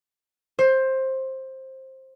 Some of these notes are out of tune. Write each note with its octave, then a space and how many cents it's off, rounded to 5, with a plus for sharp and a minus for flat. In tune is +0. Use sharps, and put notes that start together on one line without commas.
C5 +15